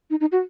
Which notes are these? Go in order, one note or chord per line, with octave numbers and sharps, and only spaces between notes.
D#4
D#4
F#4